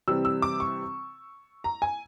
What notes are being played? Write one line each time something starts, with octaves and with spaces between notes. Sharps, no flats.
C3 E3 G3 C4 E6
E6
D6
C#6
A#5
G#5